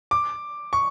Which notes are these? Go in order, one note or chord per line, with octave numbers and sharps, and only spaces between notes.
D6
C#6